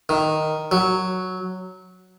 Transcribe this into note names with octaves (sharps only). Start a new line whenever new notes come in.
D#3
F#3